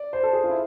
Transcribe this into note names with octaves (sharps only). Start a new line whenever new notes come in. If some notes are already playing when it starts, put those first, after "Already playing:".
Already playing: D5
C5
A4
G#4
F4
E4